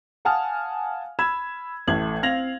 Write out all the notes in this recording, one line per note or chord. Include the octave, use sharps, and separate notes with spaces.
F5 F#5 G#5 A5 D#6 F6
B5 E6 G#6 E7
A1 A3 G#6 F#7
C4 F5 G#6 A#6 F7 F#7